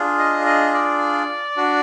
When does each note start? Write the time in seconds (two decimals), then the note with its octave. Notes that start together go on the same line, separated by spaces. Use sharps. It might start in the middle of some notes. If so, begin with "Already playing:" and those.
Already playing: D4 F4 G#4
0.18 D#5
0.46 D#5
0.74 D5
1.57 D4 F#4